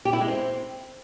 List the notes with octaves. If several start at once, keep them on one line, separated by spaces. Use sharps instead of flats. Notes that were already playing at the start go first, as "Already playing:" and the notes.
G4
E4
G#3
C4